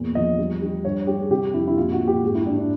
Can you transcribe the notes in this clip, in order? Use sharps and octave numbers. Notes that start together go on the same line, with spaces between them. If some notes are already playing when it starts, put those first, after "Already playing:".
Already playing: E2 A#2
F3 D#5
G3
G3
G2 C#5
G3 G4
G#4
C3 G4
F2 E4
E4
A#2 F4
F#4
A#2
G4
G#2 G#4
E4
G#2 D4
D4